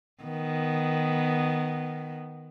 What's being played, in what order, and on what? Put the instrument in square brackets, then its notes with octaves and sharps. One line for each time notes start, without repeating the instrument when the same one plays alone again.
[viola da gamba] D#3 B3